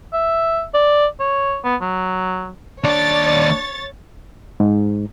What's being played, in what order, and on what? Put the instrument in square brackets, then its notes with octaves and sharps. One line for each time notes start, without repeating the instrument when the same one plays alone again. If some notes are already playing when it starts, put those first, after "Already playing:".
[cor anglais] E5
D5
C#5
B3
F#3
[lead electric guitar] D#2 D5 [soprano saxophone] D4 [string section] C#5 A6
[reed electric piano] G#2